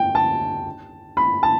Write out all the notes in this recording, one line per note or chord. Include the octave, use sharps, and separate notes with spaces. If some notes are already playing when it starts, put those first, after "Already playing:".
Already playing: G5
A5
B5
A5